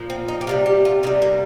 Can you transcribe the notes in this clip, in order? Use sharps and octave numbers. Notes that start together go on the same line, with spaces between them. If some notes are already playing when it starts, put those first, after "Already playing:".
Already playing: A#2 F3
C4
D#4
G4
C3 D#3 G3 F4
G4
F4
C3 D#3 G3 D#4
A#3